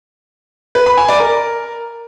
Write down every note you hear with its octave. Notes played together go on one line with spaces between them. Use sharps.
B4
B5
G#5
D5
A#4